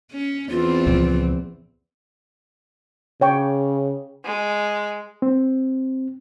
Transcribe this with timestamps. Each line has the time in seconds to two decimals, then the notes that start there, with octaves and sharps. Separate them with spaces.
0.12 C#4
0.50 E2 E3 C4 F4
0.87 C#2 A#2 F3
3.21 C#3 C#5 G5 C#6
4.25 G#3
5.22 C4